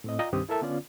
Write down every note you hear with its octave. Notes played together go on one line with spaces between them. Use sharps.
A2 C4 D#5
F4 D5 D#5 F5 G5 A#5
C2 G2 D#3 C4 G4 D#6
E4 A4 A#4 E5 A5
D3 B3 C#4 F4 D5